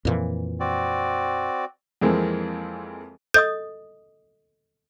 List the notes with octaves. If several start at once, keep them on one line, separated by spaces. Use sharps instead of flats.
F2 A#2 E3
C4 F#4 D5
F2 E3 G#3 A#3 C4
A4 D#5 D#6 G6